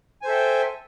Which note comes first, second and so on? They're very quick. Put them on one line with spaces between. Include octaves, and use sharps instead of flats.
G#5 C5 A4 E5 G5